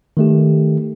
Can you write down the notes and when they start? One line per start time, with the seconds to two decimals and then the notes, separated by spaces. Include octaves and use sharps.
0.17 D#3 A3 G4